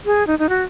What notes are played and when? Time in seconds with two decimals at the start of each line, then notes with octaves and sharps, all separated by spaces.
0.06 G#4
0.27 D#4
0.39 D#4
0.49 F#4